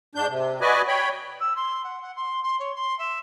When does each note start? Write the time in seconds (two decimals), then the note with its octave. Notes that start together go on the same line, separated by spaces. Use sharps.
0.15 G#2 D4 G6
0.29 C3
0.61 F#4 B4 D5 D#5 G#5
0.88 C#5 G5 B5
1.40 E6
1.55 C6
1.84 F#5
2.02 F#5
2.16 C6
2.43 C6
2.59 C#5
2.75 C6
2.99 E5